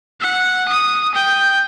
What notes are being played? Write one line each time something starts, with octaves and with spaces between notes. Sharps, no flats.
F#5
D#6
G5